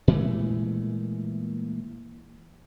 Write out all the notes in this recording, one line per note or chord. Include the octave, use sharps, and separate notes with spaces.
A#2 E3 G#3 A3